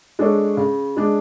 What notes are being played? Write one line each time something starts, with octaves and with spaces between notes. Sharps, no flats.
G#3 D4 A4 C#5
C#3
G#3 D4